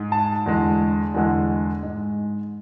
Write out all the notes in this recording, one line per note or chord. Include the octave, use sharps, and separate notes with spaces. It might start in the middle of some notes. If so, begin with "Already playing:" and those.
Already playing: G#2 G#3
A5
E2 D3 G#3
E2 D3 G#3
G#2 G#3